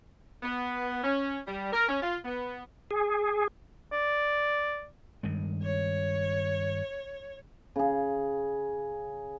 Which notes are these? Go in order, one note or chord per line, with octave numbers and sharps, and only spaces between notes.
B3
C#4
G3
A#4
C#4
F4
B3
G#4
D5
G2 D#3 G#3
C#5
C#3 G#4